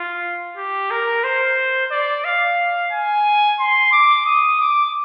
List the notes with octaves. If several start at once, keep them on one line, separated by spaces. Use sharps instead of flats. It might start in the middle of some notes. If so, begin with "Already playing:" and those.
Already playing: F4
G4
A#4
C5
D5
F5
G#5
C6
D6
D#6
D6